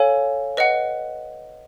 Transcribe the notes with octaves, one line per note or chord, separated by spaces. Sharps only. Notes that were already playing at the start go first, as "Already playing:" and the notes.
Already playing: A4 C#5 F5 G#5
B4 D#5 F#5